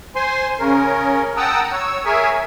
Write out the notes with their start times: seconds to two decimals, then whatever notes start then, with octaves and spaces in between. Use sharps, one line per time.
0.15 C5 G#5 C6
0.60 C#3 C#4 A#4
1.37 F#5 G5 A5 A#5 D#6 E6
1.72 C#5 E6
2.05 G#4 A#4 C#5 E5 G#5